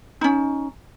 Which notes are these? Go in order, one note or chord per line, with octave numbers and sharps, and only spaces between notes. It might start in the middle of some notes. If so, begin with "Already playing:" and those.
C#4 D#4